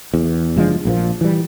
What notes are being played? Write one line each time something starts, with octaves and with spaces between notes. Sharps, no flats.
E2
F#1 F3 G#3 D4
A#1 A#2 F3
E3 G3